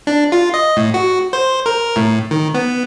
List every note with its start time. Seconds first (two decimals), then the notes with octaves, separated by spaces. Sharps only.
0.07 D4
0.32 F4
0.54 D#5
0.77 A2
0.94 F#4
1.33 C5
1.66 A#4
1.96 A2
2.31 D#3
2.55 B3